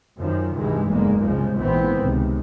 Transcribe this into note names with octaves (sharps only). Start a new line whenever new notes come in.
F#2 D#3 F3
D2 G2 C3 D#3 E3 G#3
F#1 E2 G#2 D3 G#3 A#3
C2 C#3 F3 G#3
A#1 G#2 E3 B3 C4
C#2 C3 D#3